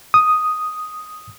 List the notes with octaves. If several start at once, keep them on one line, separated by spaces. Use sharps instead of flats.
D#6